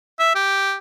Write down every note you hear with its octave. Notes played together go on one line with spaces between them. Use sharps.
E5
G4